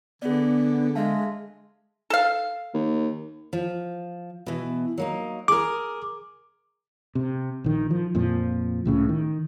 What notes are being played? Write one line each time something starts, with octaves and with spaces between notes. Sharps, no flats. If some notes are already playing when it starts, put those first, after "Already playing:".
D3 B3 G#4 D5
G#3 E5 F5 A5
A4 F5
D#2
F3
B2 E3
F#3 A#3 D#4
G#4 A#4 D6
C3
A#1 D#3
F3
F2 A#2 F3
C#2 A2 C#3
D#3